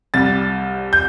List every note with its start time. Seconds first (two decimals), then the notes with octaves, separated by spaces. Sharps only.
0.14 C2 C3 G3 A6
0.93 G6